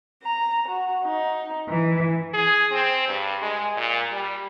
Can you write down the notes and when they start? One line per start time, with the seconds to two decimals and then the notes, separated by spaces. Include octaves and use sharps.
0.22 A#5
0.68 F#4
1.05 D#4
1.69 E3
2.34 G#4
2.72 C4
3.08 G2
3.42 G#3
3.76 A#2
4.12 G3